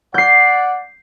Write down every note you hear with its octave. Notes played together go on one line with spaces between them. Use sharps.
D5 F#5 G6 C7